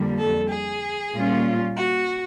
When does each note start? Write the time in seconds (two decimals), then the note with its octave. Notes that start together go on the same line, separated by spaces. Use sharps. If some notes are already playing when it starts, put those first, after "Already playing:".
Already playing: F2 D3 G3 A#3
0.18 A4
0.49 G#4
1.14 A#2 G3 A#3 C#4 F4
1.77 F#4